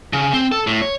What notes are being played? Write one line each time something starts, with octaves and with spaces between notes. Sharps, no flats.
C#3
C4
A4
A2
C#5